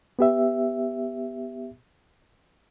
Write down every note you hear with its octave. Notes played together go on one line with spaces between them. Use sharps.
B3 G4 E5